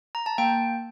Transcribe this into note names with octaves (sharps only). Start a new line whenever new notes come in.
A#5
A5
A#3 G5